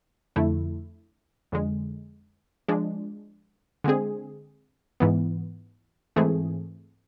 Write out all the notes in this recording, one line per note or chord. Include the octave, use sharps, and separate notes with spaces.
F2 D3 A3 E4
F2 D3 G#3
F3 G#3 D4
D3 G#3 C4 G#4
G#2 E3 B3
G#2 E3 A3 C4 G#4